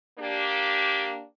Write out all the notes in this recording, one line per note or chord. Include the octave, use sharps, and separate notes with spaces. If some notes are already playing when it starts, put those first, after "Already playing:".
A#3 D4 G4